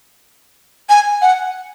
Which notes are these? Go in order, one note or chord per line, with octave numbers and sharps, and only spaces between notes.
G#5
F#5